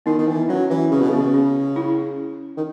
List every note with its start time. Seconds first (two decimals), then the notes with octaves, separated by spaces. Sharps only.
0.06 D#3 B3 D#4
0.18 D#3
0.27 E3 B3
0.49 F#3 C#4
0.70 E3 C#4
0.92 C#3 C#4
1.01 B2
1.10 C#3 B3
1.34 C#4
1.76 C#4 E4
2.57 D#3